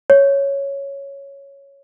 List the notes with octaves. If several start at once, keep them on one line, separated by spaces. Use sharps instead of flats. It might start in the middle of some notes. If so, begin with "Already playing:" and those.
C#5